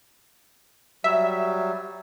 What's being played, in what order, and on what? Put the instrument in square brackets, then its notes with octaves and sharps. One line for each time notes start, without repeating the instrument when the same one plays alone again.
[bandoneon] F#3 G3 [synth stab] E5